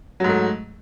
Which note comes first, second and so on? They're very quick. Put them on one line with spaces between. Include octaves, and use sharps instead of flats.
F#3 G#2 A3